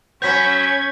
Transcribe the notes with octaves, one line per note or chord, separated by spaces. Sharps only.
F#3 B3 C#4 G6 G#6 B6